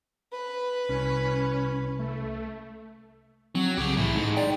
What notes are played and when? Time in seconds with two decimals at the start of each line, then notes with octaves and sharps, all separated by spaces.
0.32 B4
0.89 C2 C#4
1.99 A3
3.55 F#3 C4
3.77 C2 C#3 G4 G#4
3.97 A2 E3 A3
4.15 G#2
4.36 D5 G5